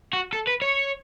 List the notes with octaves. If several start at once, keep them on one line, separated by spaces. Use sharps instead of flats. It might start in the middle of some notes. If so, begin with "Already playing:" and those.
F#4
A4
B4
C#5